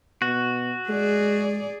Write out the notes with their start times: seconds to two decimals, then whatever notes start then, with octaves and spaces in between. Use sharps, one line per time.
0.22 B2 F#4
0.89 G#3 G#4 D5